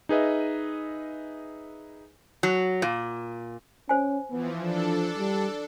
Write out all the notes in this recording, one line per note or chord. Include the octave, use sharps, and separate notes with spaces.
D#4 G#4 B4 D#5 E5
F#3
A#2
C#4 C5 G#5
E3 F3 B3
F3 D4 A4
G3